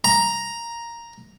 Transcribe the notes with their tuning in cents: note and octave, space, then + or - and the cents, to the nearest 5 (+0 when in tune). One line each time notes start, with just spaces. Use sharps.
A#5 +5